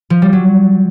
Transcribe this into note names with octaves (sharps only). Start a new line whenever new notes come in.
F3
G3
F#3